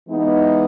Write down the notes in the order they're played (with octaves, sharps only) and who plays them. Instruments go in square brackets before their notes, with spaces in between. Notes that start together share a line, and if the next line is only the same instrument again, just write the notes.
[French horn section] E3 G#3 B3 D#4